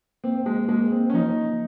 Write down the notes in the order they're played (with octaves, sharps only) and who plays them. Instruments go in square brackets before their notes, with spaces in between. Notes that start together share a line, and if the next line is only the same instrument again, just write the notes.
[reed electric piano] A#3 [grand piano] C4
[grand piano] G#3
[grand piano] G#3 [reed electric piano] A#3
[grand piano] C4
C#4
[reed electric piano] F3 [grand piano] D#4